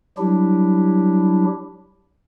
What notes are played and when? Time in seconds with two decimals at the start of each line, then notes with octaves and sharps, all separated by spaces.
0.18 F#3 G3 D4 E4 G4